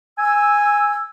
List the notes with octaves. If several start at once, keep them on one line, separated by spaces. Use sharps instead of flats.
G#5 E6